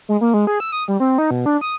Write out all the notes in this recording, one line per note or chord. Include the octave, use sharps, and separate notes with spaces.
G#3
A#3
G#3
G#4
E6
D#6
G3
C4
D#4
B2
D4
D#6